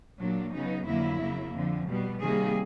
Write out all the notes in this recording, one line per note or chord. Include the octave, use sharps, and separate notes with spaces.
A#2 F#3 A#3 D4
C#3 F#3 B3 D#4
F2 D3 F#3 A#3 E4
C#3 F#3 A#3
F2 D3 F3
B2 G3 B3
C3 D#3 G3 A#3 G#4